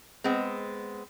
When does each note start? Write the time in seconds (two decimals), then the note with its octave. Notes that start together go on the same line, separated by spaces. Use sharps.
0.24 G#3 B3 C4